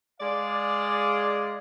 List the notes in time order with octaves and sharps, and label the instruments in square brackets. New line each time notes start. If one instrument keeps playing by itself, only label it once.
[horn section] G#3 D5 F5